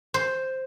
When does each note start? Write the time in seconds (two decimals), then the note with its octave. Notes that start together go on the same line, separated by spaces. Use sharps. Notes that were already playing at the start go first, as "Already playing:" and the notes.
0.14 C5